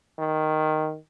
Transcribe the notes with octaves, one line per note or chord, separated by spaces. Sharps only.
D#3